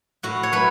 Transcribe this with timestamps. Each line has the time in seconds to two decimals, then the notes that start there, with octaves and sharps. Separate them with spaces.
0.23 A2 F#4
0.43 C#5
0.52 F#3 A3 B4